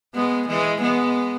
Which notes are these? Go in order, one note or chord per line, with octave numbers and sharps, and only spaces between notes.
G#3 B3
E3 G#3
G#3 B3